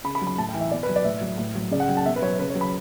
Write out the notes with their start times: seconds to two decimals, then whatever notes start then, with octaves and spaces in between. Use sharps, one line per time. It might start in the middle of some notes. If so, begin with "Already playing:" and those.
0.04 C#3 B5
0.15 B5
0.21 F#3
0.27 B5
0.38 A2 A5
0.49 G5
0.54 E3
0.60 E5
0.71 B2 D5
0.83 B4
0.89 F#3
0.96 D5
1.04 A2 E5
1.21 F#3
1.38 A2
1.55 F#3
1.71 C#3 D5
1.80 F#5
1.88 F#3 G5
1.97 A5
2.06 B2 E5
2.16 B4
2.22 F#3 C#5
2.39 C#3 B4
2.50 C#5
2.55 F#3
2.61 B5